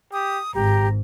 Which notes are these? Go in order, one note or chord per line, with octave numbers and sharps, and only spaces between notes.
G4 D#6
G#1 G#2 G4 A#5